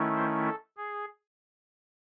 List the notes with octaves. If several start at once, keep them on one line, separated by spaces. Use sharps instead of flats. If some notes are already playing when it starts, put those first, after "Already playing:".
Already playing: D#3 A3 C#4 E4
C5
A4
G#4